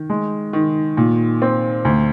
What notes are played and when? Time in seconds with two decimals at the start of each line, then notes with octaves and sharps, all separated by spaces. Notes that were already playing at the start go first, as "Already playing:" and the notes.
Already playing: D#3
0.10 G#3
0.53 D#3
0.97 A#2
1.42 C4
1.85 D2